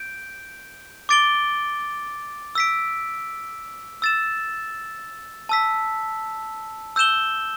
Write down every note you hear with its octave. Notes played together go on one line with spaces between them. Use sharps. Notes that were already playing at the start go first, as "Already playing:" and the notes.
Already playing: G6 D7
D6 A6 D7 G7
E6 B6 D7
E6 A6 E7
A5 E6 B6
E6 G6 E7 G7